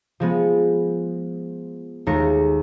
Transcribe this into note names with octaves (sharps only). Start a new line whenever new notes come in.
F3 G#3 B3
D#2 G#3 A3 D#4 A#4 C#7